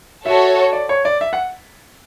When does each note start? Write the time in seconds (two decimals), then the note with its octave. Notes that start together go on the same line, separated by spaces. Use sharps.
0.26 F#4 A4 C#5 E5
0.73 D5
0.89 C#5
1.05 D5
1.21 E5
1.33 F#5